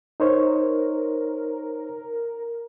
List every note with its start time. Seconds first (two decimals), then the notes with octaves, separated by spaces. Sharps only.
0.20 D#4 A#4 C5 C#5